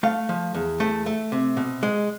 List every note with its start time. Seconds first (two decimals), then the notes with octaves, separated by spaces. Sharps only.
0.03 A3 F5
0.29 F3
0.54 E2
0.80 A3 E5
1.06 A3
1.32 C3
1.57 B2
1.83 G#3